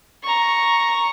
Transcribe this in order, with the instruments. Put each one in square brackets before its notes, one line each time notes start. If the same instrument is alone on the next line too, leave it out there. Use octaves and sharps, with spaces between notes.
[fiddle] A#5 C#6